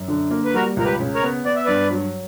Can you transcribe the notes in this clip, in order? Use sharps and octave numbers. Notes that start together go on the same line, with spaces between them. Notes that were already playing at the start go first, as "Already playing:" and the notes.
Already playing: F#2
D3
A#3
B4
G3 F#4 A#4
C#2 A#4
G4 B4
C#3
A#4 C#5
B3
B3 D5
E5
G2 B4 D5
F#3